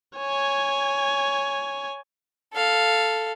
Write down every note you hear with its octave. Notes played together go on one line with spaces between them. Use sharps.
C#5 G#5
A4 F5